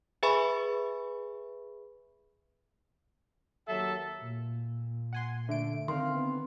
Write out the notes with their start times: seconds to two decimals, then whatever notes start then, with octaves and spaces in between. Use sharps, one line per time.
0.23 G#4 B4 E5 G#5 B5 C#6
3.68 D#2 F#3 A4 E5
4.21 A#2
5.13 F#5 G#5 C6
5.49 D3 A3 E5 D7
5.88 D3 D#3 C4 F5 C6
6.15 B3